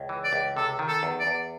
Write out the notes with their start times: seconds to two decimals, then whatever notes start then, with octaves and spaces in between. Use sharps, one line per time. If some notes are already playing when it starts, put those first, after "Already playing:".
Already playing: C#2
0.09 E3
0.24 D5
0.33 C#2
0.57 C3 A4
0.79 D#3
0.88 A4
1.03 E2
1.20 D5
1.27 E2